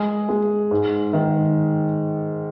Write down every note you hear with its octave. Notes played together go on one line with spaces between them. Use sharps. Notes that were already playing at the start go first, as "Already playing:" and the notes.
Already playing: G#3 G#4
G#3
G#2
D#3